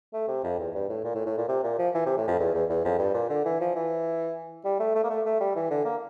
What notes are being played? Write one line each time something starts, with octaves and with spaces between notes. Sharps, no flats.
A3
C3
F2
E2
G2
A2
A#2
A2
A2
A#2
C3
A#2
F3
E3
C3
A2
F2
E2
E2
E2
F2
G2
A#2
D3
E3
F3
E3
G3
A3
A3
A#3
A3
A3
G3
E3
D3
A#3